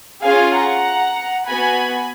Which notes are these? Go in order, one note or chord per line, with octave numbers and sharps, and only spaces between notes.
C#4 F4 G#4 F5 G#5
F#5 A#5
B3 F#4 G#5 B5